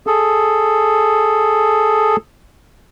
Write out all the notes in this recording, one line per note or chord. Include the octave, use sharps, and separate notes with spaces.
G#4 A4